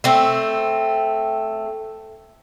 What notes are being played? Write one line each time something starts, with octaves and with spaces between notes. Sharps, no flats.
A3 C4